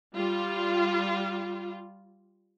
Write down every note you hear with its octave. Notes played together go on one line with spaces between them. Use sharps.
G3 F4